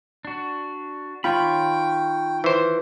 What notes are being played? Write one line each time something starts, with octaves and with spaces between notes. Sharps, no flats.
D4 F#4
D#3 F4 C#5 G5 B5
E3 C5